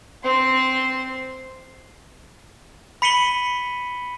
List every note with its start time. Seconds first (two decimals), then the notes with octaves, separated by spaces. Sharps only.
0.24 C4 C6
3.02 B5 B6 C#7 D#7 F#7 G7